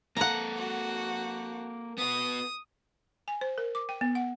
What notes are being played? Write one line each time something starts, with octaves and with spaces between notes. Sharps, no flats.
A#3 A4 F#5 A#5
F#4
B3 F#4 D#6
G#5
C5
A#4
D6
G5
B3
F#5